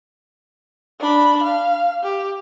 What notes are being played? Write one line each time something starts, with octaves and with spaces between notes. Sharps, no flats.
D4 B5
F5
G4